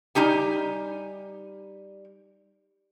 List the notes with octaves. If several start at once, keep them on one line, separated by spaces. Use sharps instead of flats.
G3 D#4 G4 G#5